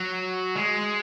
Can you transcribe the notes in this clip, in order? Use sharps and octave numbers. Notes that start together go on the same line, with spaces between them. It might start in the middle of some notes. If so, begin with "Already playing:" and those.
Already playing: F#3
G#3